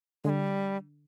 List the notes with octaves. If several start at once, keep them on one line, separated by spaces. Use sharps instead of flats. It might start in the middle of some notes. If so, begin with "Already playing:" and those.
D3 G3 G#3